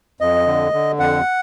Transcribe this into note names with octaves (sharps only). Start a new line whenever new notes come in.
F2 D#5
D3
D3
F2 F#5